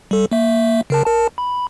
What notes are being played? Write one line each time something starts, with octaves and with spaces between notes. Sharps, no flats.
G3 A4
A#3 E5
C#3 A#4 A5
A#4 A5
B5